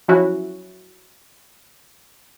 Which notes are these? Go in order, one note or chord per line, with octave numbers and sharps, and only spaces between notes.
F3 F#3 C#4 E4 F#4